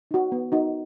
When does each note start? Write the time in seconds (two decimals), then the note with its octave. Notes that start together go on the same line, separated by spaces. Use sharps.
0.11 D#4 F#4
0.32 B3
0.52 D#4 F#4